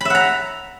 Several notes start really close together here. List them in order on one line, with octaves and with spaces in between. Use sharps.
B5 E5 F#5 A#5